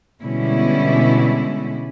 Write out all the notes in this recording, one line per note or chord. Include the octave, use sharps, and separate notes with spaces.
B2 D3 G3 G#3 C#4 E4